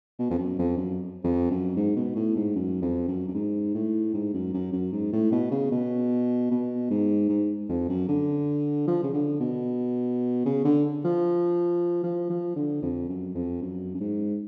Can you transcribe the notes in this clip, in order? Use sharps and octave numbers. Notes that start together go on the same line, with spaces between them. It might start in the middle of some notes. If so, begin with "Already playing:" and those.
B2
F2
F#2
F2
F#2
F2
F#2
G#2
B2
A2
G#2
F#2
F2
F#2
F#2
G#2
A2
G#2
F#2
F#2
F#2
G#2
A2
B2
C#3
B2
B2
G#2
G#2
F2
F#2
D3
F3
C#3
D3
B2
C#3
D3
F3
F3
F3
D3
F2
F#2
F2
F#2
F#2
G#2